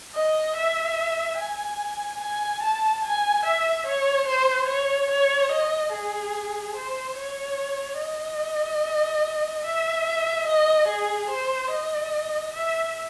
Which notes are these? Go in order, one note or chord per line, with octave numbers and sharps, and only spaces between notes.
D#5
E5
G#5
G#5
A5
G#5
E5
C#5
C5
C#5
C#5
D#5
G#4
C5
C#5
D#5
E5
D#5
G#4
C5
D#5
E5